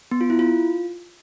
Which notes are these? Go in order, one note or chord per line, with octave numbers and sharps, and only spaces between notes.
B3
F4
E4
F4